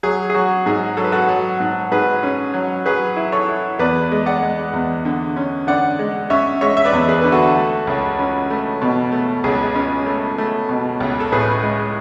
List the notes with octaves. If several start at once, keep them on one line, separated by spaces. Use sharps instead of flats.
F#3 G#4
G#4
F#3 F#4
G#2 G#4
F#3 A4
B4
F#4 A4
F#3
G#2
G#2 G#4 B4
C#4
F#3
F#3 G#4 B4
E4
A4 C#5
E4
E2 B4 D5
G#3
D5 F#5
G#3
E2
D3
C#4
D3 D5 F#5
G#3
C#4 C#5 E5
G#3 C#5 E5
E5
B4 D5
E2
G#4 B4
D3 B4
F#4 A4
A3
C#2
C#4
A3
B2
A3
C#2 G#4
C#4
A3
A3
B2
C#2
A4
A2 G#4 B4
G#3